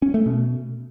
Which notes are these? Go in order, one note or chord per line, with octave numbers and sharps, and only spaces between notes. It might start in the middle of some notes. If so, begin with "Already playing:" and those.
C#4
A3
B2